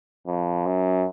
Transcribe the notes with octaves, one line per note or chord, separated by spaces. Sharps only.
F2
F#2